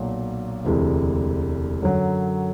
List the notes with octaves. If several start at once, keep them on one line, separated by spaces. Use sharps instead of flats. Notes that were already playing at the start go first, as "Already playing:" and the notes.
Already playing: B1 A#2 F#3
E1 D2 C3 E3 G#3
F#2 D3 F#3